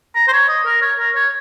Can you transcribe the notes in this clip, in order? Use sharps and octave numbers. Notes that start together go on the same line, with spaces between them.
A#5
C5
C#5
D#5
A#4
C#5
A#4
C#5